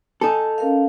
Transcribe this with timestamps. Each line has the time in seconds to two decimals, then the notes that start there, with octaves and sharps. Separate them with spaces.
0.21 D#4 A4 G#5
0.58 C#4 A#4 F5